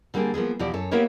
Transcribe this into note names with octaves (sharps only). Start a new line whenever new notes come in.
D3 G3 A#3 C4 G#4
F3 A#3 B3 G#4
E2 B2 F3 E4 G4 D5
F#2 A4 C#5
A#3 B3 E4 G4 A#4 C#5